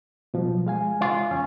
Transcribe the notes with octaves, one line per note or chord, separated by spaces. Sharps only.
B2 F3 F#3
G#3 F5 G#5
F4
E2 C#4